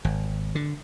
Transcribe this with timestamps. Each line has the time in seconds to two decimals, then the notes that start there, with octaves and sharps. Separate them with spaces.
0.05 G#1
0.55 D3